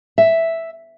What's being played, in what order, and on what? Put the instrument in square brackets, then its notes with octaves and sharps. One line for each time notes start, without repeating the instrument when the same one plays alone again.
[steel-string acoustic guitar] E5